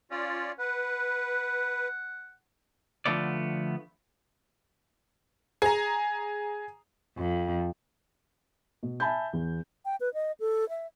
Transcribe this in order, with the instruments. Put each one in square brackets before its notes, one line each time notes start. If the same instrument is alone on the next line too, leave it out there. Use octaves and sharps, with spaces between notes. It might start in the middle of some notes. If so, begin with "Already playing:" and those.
[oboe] C#4 [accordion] F4 D5
[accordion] B4 [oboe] F#5
[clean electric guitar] D3 F3 A3 B3 D5
[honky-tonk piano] G#4 A#5
[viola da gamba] F2
[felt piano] B2
E5 G#5 A5 B5 G6
E2
[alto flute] G5
B4
D#5
A4
E5